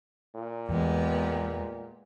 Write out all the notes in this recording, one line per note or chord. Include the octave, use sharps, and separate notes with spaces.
A#2
E2 E3 G#3 B3 G4